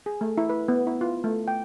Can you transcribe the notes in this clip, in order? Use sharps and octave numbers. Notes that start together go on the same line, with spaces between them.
G#4
A3
E4
B4
B3
E4
F4
A3
G5